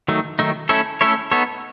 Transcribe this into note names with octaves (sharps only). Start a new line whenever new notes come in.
D#3 F#3 A3 D#4
D#3 F#3 A3 D#4
A3 C#4 E4 A4 C#5
A3 C#4 E4 A4 C#5
B3 D#4 A4 C#5